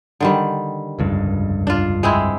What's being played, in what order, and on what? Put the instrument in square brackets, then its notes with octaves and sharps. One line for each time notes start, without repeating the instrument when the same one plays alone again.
[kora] D3 D#3 G3
[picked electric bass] F1 C#2 G2
[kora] D4 F4
G#3 C4 E4